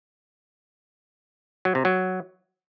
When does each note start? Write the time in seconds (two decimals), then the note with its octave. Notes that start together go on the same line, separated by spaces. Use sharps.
1.65 F#3
1.75 C3
1.85 F#3